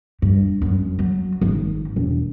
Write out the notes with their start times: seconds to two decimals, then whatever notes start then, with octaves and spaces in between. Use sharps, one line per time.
0.22 G2
0.62 F#2
0.99 F#3
1.41 G#1
1.96 E1